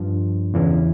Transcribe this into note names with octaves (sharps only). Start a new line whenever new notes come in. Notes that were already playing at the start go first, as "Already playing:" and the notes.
Already playing: G2 F3 D4
E2 C#3 E3 E4